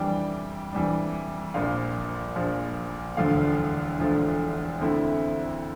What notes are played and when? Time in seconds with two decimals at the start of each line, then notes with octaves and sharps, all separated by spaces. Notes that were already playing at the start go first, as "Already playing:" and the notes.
Already playing: F2 E3 G3 D4 G5
0.73 F2 E3 G3 D4
1.54 A#1 A#2 F3 F5
2.36 A#1 A#2 F3
3.17 E1 D2 D3 F3 A3 F5
3.99 E1 D2 D3 F3 A3
4.79 F2 D3 A3 C4 E4